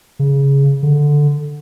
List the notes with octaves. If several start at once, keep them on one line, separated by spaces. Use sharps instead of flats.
C#3
D3